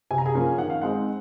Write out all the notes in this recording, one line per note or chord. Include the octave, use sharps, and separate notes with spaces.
C3 G#5
A#5
G#4 G#5
F3 A#3 C#4
D#3 F#5
F5
G#3 C4 D#4 F#5